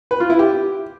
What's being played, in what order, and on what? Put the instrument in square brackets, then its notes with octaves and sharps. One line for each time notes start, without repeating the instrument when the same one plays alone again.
[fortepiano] B4
F4
E4
G4